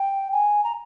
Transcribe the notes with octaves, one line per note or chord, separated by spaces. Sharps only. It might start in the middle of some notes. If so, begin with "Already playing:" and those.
Already playing: G5
G#5
A#5